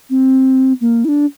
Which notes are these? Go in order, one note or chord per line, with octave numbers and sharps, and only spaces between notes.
C4
A#3
E4
D4